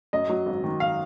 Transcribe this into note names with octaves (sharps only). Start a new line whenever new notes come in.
F#2 D#5
F#3
G#1
D#3
F5